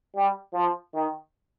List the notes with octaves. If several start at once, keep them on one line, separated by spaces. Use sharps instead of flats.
G3
F3
D#3